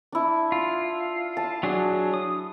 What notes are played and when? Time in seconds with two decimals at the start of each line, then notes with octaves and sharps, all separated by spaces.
0.12 D4 E4
0.52 F4
1.37 A5
1.63 F#3 D4 G#4
2.14 D#6